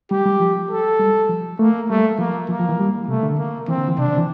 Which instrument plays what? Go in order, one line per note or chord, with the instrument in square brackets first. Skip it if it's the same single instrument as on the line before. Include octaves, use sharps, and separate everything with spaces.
[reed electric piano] G3 [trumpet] G4
[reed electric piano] G3
F3
[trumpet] A4
[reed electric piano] G3
F3
[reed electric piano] A3 [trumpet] A#3
[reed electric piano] G3 [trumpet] A3
[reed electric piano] F3 [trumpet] A#3
[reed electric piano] F3 [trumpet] A#3
[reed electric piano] F3
E3
G3
[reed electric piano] C3 [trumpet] A3
[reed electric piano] D3
[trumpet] A#3
[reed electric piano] E3 [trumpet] C4
[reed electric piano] D3
E3
[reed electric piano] C3 [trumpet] D4
[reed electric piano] D3
E3